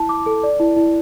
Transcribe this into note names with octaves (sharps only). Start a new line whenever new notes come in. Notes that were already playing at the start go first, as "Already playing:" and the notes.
Already playing: E4 A5
D6
A4
D5
E4
E4